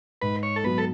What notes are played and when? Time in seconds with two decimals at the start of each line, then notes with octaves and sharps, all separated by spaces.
0.22 G#2 B4
0.43 C#5
0.56 A4
0.64 F#3 B3 B4
0.78 A4